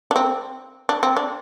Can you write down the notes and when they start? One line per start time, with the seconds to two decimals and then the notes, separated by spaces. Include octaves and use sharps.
0.11 D4
0.16 C4
0.89 D4
1.03 C4
1.17 D4